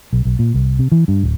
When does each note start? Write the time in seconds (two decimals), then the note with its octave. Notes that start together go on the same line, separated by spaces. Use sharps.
0.13 B1
0.25 B1
0.39 A#2
0.54 C2
0.79 C3
0.92 E3
1.08 G2
1.23 D1